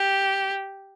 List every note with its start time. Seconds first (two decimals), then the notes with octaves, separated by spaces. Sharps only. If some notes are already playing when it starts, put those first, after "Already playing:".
Already playing: G4